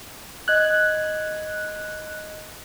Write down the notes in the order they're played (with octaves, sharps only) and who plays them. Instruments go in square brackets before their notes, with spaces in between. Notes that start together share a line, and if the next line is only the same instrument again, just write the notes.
[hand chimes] D#5 G#6 [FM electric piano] F#6